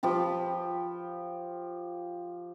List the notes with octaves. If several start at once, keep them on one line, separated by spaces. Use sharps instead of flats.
F3 G4 B5